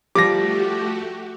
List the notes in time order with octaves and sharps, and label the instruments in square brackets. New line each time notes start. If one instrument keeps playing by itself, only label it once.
[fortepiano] F3 G3 [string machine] A3 F#4 G4 [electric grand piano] D6 A#6